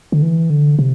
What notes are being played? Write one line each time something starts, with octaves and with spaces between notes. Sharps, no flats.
D3
E3
D3
C3